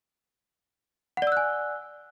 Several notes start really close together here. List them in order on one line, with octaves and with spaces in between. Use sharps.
F#5 D5 E6 F#6 G#5